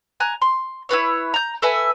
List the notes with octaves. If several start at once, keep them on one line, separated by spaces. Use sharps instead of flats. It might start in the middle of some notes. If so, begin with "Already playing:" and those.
G#5 A#5 F#6
C6
E4 F4 B4 C#5
A#5 G6
A4 B4 E5 G#5